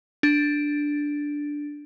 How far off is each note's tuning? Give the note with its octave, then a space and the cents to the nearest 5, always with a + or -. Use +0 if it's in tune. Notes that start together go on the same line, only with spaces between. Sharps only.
D4 +0